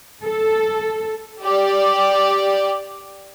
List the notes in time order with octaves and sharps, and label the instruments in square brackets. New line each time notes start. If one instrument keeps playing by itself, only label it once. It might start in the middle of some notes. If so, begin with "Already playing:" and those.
[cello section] A4
[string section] G4 D5